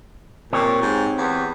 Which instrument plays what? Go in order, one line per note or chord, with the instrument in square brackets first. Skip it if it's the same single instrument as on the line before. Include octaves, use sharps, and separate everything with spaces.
[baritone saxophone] A#2 [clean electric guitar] C4 G4 C#5
[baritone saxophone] G#2
E2